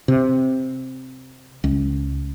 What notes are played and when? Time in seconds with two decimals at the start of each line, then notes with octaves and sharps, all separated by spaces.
0.08 C3
1.64 C#2